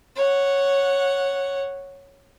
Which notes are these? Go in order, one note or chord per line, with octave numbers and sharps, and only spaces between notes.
C#5 F#5